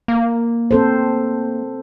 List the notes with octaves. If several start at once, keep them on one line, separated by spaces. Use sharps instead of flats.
A#3
C4 A4 C5